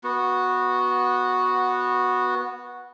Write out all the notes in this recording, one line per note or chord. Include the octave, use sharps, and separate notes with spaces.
B3 F#4